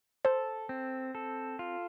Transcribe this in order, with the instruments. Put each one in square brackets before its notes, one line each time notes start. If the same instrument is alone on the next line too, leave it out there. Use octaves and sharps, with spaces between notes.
[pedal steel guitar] A4 [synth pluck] C5
[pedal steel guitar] C4
A4
F4